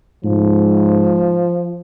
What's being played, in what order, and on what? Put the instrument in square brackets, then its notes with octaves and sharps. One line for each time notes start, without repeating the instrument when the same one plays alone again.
[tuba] G#2 [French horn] F3